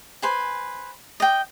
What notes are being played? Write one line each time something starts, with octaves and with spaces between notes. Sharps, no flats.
B4 C5 G#5
D#5 G5